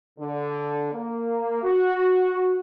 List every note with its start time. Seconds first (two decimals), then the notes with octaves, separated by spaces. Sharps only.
0.19 D3
0.93 A#3
1.63 F#4